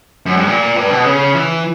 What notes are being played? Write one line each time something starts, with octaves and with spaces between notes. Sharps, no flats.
F#2
G2
A#2
G2
B2
C#3
E3